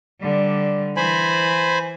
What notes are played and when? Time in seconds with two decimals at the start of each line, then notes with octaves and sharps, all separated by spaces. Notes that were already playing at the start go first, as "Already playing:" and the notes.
0.21 D3 G3
0.97 E3 C5 G#5 B5